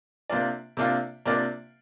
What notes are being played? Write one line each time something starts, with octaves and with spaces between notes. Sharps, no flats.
C3 A#3 D4 F4 D5
C3 A#3 D4 F4 D5
C3 A#3 D4 F4 D5